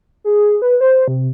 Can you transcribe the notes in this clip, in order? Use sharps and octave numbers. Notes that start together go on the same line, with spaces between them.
G#4
B4
C5
C3